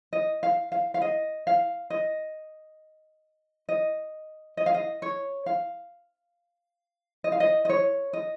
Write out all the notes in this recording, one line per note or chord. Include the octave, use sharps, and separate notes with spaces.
D#5
F5
F5
F5
D#5
F5
D#5
D#5
D#5
F5
D#5
C#5
F5
D#5
F5
D#5
D#5
C#5
D#5